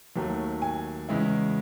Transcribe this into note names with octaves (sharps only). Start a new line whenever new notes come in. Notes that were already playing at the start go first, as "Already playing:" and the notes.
D#2 D#3 F#3 A3
G#5
E2 C#3 G#3 C#4 E4